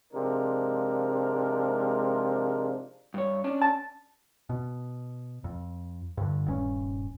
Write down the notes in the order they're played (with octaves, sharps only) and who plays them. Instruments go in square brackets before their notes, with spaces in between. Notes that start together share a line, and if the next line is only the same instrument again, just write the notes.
[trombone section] G#2 C3 F3 G#3 D4 A#4
[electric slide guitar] G2 C#5
C#4 D4
[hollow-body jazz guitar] A5
[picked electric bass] B2
F2
G2 D3
D#1 G2 A3 C#4